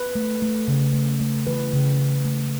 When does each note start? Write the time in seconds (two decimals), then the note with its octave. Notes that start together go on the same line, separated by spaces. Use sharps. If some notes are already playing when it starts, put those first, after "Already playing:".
Already playing: B4
0.15 A3
0.42 A3
0.68 C#3
0.94 A3
1.21 A3
1.47 E3 B4
1.73 C#3
1.99 C#3
2.25 A3